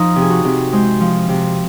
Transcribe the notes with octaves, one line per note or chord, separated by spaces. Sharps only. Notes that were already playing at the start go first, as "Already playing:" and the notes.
Already playing: F3 D#4 F4
C3
G#4
F#4
C3
G#3 C5
F3
C3